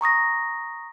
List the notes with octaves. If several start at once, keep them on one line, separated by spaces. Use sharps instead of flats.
A#5 C#6 D#6 A#6